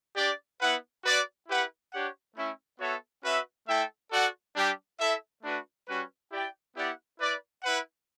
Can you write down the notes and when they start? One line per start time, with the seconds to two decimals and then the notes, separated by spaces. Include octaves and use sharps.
0.16 D4 G4 D5
0.60 B3 E4 B4 F#5
1.04 F#4 B4 D5
1.48 E4 G4 B4 F#5
1.91 D4 G4 C#5 F#5
2.36 A3 C#4 E4
2.79 B3 F#4 A4 C#5 E5
3.23 C#4 F#4 B4 E5
3.67 A3 E4 A4 E5 G5
4.11 F#4 A4 D5 F#5
4.56 G3 D4 G4
4.99 E4 A4 E5
5.42 A3 D4 F#4 B4
5.87 G3 C#4 F#4 B4
6.30 E4 G4 D5 G5
6.75 B3 E4 G4 D5 F#5
7.19 E4 B4 D5
7.62 E4 B4 F#5